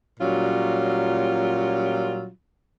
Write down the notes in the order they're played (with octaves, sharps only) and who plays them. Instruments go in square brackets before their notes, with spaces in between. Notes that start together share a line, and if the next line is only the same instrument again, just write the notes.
[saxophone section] A#2 F#3 G3 C#4 F4